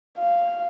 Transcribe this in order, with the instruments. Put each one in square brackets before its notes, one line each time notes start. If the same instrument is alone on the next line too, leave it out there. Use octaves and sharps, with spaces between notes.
[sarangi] F5